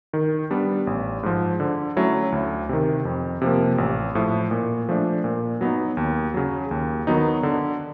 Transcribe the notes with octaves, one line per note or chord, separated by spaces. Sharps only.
D#3
G3 B3 D4
A1
G#2 F3
D3
F#3 A3 C#4 E4
D2
C3 D#3
F2
C3 F3 A#3
A1
A2 F3
A#2
F3 A3 D4
A#2
F#3 B3 D#4
D#2
C#3 F#3
D#2
D#3 F#3 B3 D#4
D3